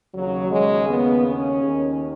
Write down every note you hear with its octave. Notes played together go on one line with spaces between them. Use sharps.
D#2 C#3 F#3
G#3
B3
C#4
D#2 D#3